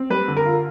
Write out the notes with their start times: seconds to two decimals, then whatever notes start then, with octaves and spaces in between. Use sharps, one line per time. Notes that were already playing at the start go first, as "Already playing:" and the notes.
Already playing: C4
0.10 G3 B4
0.28 D3
0.37 A#4
0.45 F4